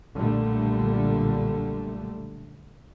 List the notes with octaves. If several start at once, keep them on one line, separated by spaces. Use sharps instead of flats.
B1 A#2 D3 G3 A3